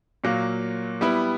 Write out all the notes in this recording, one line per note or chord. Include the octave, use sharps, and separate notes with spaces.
A#2 F#3 A#3
G3 B3 E4